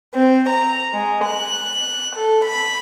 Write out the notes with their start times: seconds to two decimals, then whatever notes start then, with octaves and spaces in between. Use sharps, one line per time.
0.14 C4
0.49 A#5
0.93 G#3
1.25 F#6
2.16 A4
2.45 B5